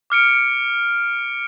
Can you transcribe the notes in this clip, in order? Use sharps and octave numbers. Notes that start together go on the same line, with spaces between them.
D6 F6 C#7 D7